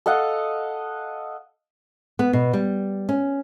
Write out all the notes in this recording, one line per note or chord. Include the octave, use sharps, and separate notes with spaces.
A4 D#5 F5 F#5
B3
B2
G3
C#4